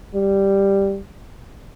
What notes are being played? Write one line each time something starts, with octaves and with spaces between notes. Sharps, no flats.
G3